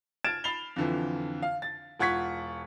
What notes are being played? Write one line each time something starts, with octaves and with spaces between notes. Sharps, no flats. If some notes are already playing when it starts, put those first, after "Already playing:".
F6 G#6 A6 D7 E7
B5 A6 C7 F7 G7
F2 D3 E3
F5
A6
E1 F4 F#5 C#6 G#6 B6